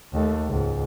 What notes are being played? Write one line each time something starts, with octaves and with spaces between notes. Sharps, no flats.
D#2 A3
C#2 G#2